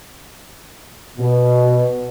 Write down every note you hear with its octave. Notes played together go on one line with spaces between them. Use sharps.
B2